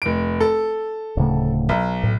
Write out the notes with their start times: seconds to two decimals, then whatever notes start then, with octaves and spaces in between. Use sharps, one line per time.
0.02 F1 D7
0.40 A4
1.17 D1 C#3 A3
1.69 B1
2.03 A2